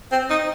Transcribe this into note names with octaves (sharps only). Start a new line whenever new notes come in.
C4
D#4